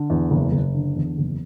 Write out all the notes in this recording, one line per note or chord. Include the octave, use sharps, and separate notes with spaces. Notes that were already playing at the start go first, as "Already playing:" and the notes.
Already playing: D3
E2
F#1
F#1
D3
E2
F#1